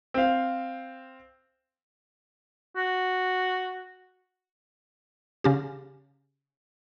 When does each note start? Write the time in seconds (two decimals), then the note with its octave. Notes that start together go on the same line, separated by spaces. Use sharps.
0.14 C4 F5
2.77 F#4
5.44 C#3 C#4 G4